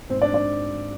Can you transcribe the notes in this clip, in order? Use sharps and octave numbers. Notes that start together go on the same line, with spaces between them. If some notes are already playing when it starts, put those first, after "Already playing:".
G#2 C4 C5
D4 D5
D4 D5